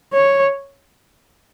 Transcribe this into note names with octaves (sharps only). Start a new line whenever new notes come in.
C#5